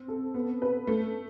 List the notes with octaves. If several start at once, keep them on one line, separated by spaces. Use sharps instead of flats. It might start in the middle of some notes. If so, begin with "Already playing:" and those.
Already playing: C4
A4
B3
B4
A3